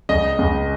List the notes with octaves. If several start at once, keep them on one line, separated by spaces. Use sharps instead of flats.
C#2 D#5
C#2